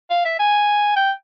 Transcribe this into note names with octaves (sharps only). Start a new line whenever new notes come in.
F5
E5
G#5
G5